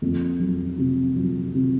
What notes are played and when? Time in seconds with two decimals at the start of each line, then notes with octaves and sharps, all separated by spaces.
0.02 F2
0.40 F#3
0.78 C3
1.16 F#3
1.55 C3